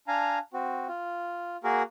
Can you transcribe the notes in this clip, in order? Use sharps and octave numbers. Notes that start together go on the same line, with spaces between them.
D4 F5 G#5 A#5
C4 F#4
F4
A#3 F#4 G#4 A#4